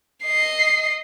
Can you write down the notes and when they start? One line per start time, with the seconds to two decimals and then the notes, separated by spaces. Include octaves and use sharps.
0.24 D#5 C7